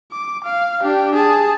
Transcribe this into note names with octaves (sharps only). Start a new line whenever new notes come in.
D6
F5
D4 G4
G#4 A5